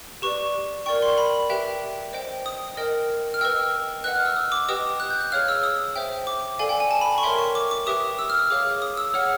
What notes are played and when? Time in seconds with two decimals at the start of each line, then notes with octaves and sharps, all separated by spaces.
0.22 G4 B4 D5 C#6
0.86 A#4 D5 G5 C#6
1.02 C6
1.18 B5
1.50 G4 B4 E5 G5
2.13 C5 D#5 G5
2.46 D#6
2.77 A#4 D#5 G5
3.34 F6
3.41 B4 D#5 G5 E6
4.04 B4 D#5 F#5 F#6
4.15 F6
4.25 E6
4.36 D#6
4.52 D6
4.69 G4 B4 D#5 G5 D#6
5.00 F#6
5.10 G6
5.21 F#6
5.32 G#4 C#5 F5 F6
5.48 E6
5.64 D#6
5.96 C5 E5 G5
6.27 D6
6.59 A4 D5 F5 G#5
6.69 G5
6.80 G#5
6.91 A5
7.01 B5
7.18 C#6
7.23 A#4 C#5 E5 G5 C6
7.39 C#6
7.55 D6
7.71 D6
7.87 G4 B4 E5 G5 D#6
8.19 E6
8.30 F6
8.39 D#6
8.50 G#4 C#5 F5 D6
8.82 D#6
8.97 E6
9.14 G#4 C#5 F#5 F6